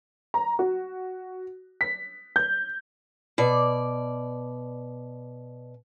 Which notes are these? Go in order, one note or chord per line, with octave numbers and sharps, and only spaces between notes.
A#5
F#4
B6
G6
B2 D5